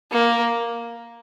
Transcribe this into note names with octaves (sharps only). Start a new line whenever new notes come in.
A#3